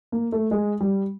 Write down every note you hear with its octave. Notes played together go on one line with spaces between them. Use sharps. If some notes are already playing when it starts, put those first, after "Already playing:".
A#3
A3
G#3
G3